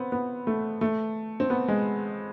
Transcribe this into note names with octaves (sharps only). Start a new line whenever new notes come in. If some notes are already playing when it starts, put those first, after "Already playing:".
Already playing: B3 C4
B3
A3
A3
C4
B3
G#3